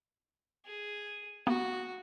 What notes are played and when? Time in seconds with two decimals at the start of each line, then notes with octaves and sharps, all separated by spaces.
0.65 G#4
1.47 A#3 B3 F#4 G4